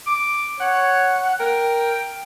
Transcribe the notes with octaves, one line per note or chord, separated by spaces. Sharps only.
D6
C#5 F#5
A#4 G5